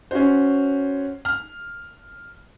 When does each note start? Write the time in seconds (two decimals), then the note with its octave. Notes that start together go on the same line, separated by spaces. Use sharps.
0.11 C#4 F#4 C5
1.25 F6